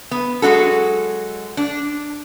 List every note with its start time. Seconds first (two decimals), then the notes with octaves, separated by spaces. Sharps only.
0.11 B3
0.42 F#3 G#3 D4 F#4 A4
1.57 D4